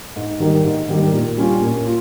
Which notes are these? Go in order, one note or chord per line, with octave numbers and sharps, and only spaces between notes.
G#2
D#3 G3 A#3
G#2
D#3 G3 A#3
A#2
G3 C#4 F4
A#2
F4